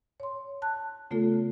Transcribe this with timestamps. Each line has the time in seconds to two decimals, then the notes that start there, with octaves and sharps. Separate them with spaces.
0.20 C#5 C6
0.62 A5 F#6
1.11 C#3 A3 B3 F4 A4